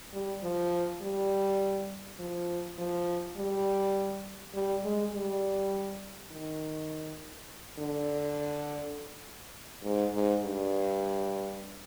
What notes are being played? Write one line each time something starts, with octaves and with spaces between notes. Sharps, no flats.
G3
F3
G3
F3
F3
G3
G3
G#3
G3
D#3
D3
G#2
G#2
G2